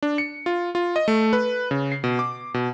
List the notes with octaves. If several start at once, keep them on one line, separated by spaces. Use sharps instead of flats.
D4
C#7
F4
F4
D#5
A3
B4
C#3
C7
B2
D6
B2